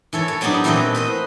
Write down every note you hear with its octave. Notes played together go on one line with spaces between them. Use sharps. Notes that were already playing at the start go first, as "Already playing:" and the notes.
E3 A4 C#5
A4
F#3 G3 B3 D4 D#4
A#2 E3 A3 C4 B4 D#5
B4 C5 D#5